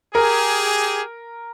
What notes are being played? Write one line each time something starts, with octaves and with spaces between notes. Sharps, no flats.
G4 G#4 A#4